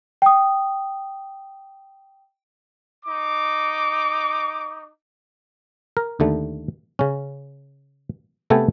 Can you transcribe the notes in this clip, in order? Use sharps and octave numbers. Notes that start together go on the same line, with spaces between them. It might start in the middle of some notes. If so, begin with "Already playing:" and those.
G5 D#6
D#4 D6
A#4
D#2 D3 A3
C#3 C#4
C3 A3 B3 A4 G5 G#5